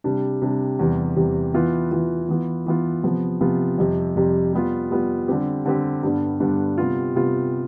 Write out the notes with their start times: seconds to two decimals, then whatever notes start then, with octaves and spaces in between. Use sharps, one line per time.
0.04 C3 G3 D4
0.42 C3 G3 D4
0.79 E2 C3 G3
1.16 E2 C3 G3
1.54 E3 B3 F4
1.91 E3 B3 F4
2.29 E3 B3 F4
2.66 E3 B3 F4
3.03 C3 F3 B3 F4
3.41 C3 F3 B3 F4
3.78 F2 C3 G3
4.16 F2 C3 G3
4.53 G3 B3 F4
4.91 G3 B3 F4
5.28 D3 G3 C4 G4
5.66 D3 G3 C4 G4
6.03 G2 D3 G3 B3 D4
6.40 G2 D3 G3 B3 D4
6.78 C3 G3 B3 F4
7.15 C3 G3 B3 F4